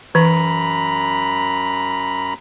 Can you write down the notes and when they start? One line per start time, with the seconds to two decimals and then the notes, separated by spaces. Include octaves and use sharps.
0.15 F#2 E3 A#5 B5